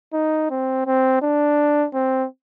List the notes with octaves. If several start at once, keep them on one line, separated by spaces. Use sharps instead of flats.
D#4
C4
C4
D4
C4